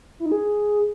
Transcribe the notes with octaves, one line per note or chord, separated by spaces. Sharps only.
E4
D#4
G#4